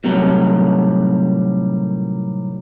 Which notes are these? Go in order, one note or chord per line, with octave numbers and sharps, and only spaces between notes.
A2 C3 D#3 F#3 G3